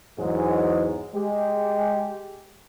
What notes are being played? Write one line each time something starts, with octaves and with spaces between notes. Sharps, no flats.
E2 G#2 F#3 G#3
G#3 G4